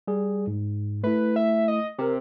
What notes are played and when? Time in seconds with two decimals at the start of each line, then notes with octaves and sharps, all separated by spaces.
0.08 G3 G#4
0.47 G#2
1.04 A3 E4 B4
1.36 E5
1.68 D#5
1.99 C3 G4 A#4